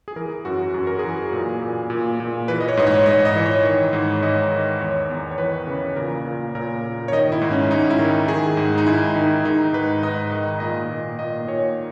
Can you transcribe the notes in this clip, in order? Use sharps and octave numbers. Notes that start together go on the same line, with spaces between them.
G#4
E3 A#4
F#2 F#4
F#2 G#4
A#4
E3 G#4
A#2
A#2
A#2
A#2
E3 B4
D#5
C#5
G#2 D#5
C#5
C#5
G#2 D#5
D#5
E3
C#5
D#3 C#5
G#2
G#2 D#5
D#3
E2 C#5
E2
C#5
E3 B4
C#3
A#2 A#4
A#2
A#2 A#4
A#2
C#5
D#3 D#5
E4
G#2
C#4
G#2 D#4
E4
D#3
D#3 G#4
G#2
D#4
G#2 E4
D#3 D#4
D#3 D#4
G#2 B4
G#2 D#5
D#3 D#5
A#2 D#5
A#2
A#2 D#5
A#2 C#5